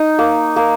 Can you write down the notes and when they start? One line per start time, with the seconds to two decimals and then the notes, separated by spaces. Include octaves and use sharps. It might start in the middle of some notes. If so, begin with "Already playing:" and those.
Already playing: D#4
0.19 A#3
0.56 A#3